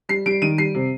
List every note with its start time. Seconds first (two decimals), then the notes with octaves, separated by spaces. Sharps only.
0.09 G3 C7
0.26 G3 D7
0.42 D#3 D#7
0.58 G3 C7
0.74 C3